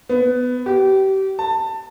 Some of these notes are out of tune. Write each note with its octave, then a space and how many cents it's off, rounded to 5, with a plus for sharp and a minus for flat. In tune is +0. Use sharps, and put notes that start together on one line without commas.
B3 +15
G4 -30
A5 +20